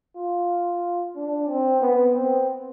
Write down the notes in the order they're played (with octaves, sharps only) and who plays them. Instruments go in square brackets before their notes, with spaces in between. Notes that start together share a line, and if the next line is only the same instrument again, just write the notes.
[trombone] F4
D4
C4
B3
C4